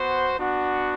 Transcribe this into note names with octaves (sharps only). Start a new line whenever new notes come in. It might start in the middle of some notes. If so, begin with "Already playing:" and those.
Already playing: B3 F#4 C5
B3 D4 F#4